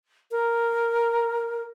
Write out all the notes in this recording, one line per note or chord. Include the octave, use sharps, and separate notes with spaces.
A#4